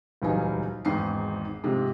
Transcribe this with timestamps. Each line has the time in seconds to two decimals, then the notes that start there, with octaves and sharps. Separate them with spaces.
0.22 D#1 C#2 E3 F#3 D#4 G#5
0.85 G#1 E2 G#2 D#4 G5 C7
1.64 G#2 C3 F3 G#3